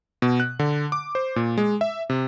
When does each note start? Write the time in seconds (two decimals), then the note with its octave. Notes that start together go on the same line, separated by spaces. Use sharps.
0.22 B2
0.40 F#6
0.59 D3
0.92 D6
1.15 C5
1.36 A#2
1.58 G#3
1.81 E5
2.10 C3